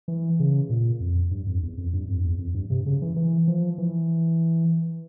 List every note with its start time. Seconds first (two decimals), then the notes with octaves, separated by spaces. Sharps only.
0.08 E3
0.40 C#3
0.70 A#2
1.00 F2
1.31 G2
1.47 F2
1.63 E2
1.78 F2
1.93 G2
2.08 F2
2.24 E2
2.39 F2
2.54 G2
2.70 C3
2.86 C#3
3.02 E3
3.16 E3
3.48 F3
3.78 E3